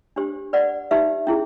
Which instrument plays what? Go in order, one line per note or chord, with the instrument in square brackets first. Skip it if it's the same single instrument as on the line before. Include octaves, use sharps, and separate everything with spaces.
[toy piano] D4 G4 C5
B4 D5 F#5
D#4 G4 B4 E5
C#4 E4 G#4